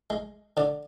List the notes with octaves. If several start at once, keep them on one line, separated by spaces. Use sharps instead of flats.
G#3
D3 D5